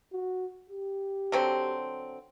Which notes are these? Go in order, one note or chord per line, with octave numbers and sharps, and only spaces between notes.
F#4
G4
D3 F#3 C4